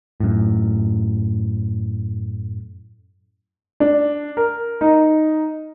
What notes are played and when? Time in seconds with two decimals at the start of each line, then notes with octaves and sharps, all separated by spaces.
0.20 F#2 A2
3.80 D4
4.37 A#4
4.81 D#4